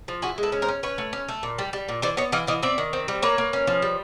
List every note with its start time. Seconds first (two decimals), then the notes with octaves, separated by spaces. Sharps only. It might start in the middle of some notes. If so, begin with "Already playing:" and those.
0.08 F3
0.22 E4 F#4 G#4
0.38 G#3
0.43 A4 B4
0.52 C#4
0.62 A#4 C5
0.68 C#4
0.83 C#4 B4 C#5
0.98 A3
1.13 C#4
1.28 A3
1.43 A#2
1.58 G3
1.73 G3
1.89 A#2
2.02 E3 C5 D5
2.17 B3 C#5 D#5
2.32 E3 D#5 F5
2.47 E3 D#5 F5
2.63 C4 D5 E5
2.78 D#3
2.93 C4
3.08 G3
3.22 A#3 B4 C#5
3.38 A#3
3.53 C#4
3.67 F3
3.82 G3